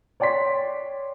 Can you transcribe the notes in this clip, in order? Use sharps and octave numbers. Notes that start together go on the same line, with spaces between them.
C#5 D5 G5 C6 B6